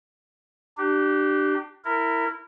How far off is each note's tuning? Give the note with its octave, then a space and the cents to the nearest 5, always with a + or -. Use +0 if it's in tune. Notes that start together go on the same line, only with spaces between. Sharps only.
D4 +25 G4 -20
E4 +0 A#4 -25